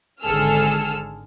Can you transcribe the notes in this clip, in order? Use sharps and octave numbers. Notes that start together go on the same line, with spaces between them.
G#1 D3 G#4 A4 E6 F6